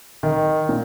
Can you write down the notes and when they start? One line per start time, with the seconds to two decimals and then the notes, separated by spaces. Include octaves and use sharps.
0.23 D#3
0.69 A#2